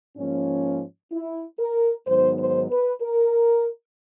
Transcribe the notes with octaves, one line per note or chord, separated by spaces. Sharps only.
G#2 F3 A#3 C#4
E4
A#4
G#2 D#3 F#3 B3 C5
C5
B4
A#4